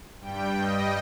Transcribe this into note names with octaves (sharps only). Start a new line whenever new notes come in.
G2 G3 G5
D#5